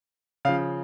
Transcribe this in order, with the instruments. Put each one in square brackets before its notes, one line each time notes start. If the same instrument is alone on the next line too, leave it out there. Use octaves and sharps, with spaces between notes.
[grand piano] C#3 F3 F5